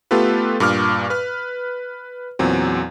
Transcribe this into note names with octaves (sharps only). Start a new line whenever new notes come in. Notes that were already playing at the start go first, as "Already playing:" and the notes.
A3 B3 F4 G4 A4 B4
G2 A#2 D6 F6
B4 F6
E2 A#2 F#3 C4